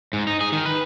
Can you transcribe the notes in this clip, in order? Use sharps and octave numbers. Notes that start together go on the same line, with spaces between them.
G#2
D#4
G#4
D#3
B4